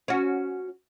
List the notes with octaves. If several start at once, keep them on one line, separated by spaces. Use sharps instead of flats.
C#4 F#4